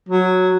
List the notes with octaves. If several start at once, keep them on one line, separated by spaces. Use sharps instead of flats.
F#3